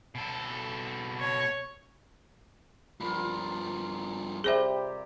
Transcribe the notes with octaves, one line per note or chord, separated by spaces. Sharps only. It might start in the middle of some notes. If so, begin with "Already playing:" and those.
B2 A4
C#5
G2 F3 F4 A#4 B5
C3 G3 G4 G#4 C5 E5